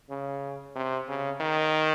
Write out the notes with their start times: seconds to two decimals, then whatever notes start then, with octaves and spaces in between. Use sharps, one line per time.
0.10 C#3
0.76 C3
1.08 C#3
1.41 D#3